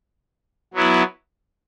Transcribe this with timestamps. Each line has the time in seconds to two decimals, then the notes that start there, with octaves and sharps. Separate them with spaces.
0.74 F#3 B3 E4